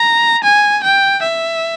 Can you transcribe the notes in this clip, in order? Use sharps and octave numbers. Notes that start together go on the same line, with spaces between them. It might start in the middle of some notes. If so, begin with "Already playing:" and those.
Already playing: A#5
G#5
G5
E5